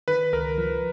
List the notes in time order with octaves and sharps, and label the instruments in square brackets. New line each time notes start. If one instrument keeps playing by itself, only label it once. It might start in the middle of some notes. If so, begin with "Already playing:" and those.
[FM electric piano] D#3 [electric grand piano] B4
[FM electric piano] C#2 [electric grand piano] A#4
[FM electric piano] F3